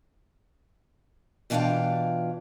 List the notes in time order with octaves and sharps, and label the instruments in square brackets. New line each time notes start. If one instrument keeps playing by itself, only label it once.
[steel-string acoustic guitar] B2 E3 D4 F4 F5 G5